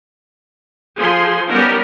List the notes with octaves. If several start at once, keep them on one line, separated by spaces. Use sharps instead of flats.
F3 G#4 A4 C6
G3 B3 C#4 D#4 A#4